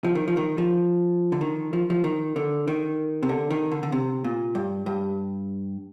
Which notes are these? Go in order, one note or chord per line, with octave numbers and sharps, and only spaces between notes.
F3
D#3
F3
D#3
F3
D3
D#3
F3
F3
D#3
D3
D#3
C3
D3
D#3
D3
D3
C3
A#2
G2
G2